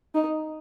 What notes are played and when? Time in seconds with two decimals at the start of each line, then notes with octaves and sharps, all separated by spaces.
0.15 D#4